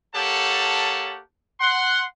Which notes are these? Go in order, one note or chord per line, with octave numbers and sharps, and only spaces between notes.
A#3 G4 A4 C#5 F#5 A5
F#5 C6